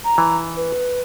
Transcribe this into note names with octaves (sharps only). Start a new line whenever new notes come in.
A#5
E3
B4